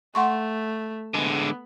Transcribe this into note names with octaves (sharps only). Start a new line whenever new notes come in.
A3 F#5 C6 C#6
D3 G#3 B3